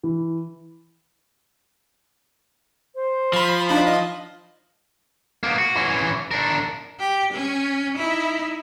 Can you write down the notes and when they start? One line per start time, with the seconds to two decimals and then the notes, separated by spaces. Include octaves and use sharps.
0.03 E3
2.95 C5
3.33 F3 B5 C6
3.69 D4 D#4 F5 B5
3.87 D#5
5.43 A#3 B3
5.58 F#4
5.76 E3 C#4
6.31 D4 A#4
7.00 G4
7.33 C#4
7.98 D#4 E4